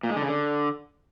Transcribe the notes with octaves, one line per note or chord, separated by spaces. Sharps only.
A#2
G#3
D3
C#3
D3